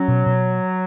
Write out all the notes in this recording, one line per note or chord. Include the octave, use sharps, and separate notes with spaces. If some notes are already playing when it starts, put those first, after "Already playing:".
Already playing: F#3 C#4
B2
B2